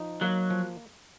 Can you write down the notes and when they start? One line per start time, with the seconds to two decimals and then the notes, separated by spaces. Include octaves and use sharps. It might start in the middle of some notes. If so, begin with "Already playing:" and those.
Already playing: F3 D#4
0.21 F#3 A#3
0.50 F3